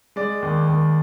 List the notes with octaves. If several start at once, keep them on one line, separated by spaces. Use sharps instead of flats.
G#3 D5
D#2
D#2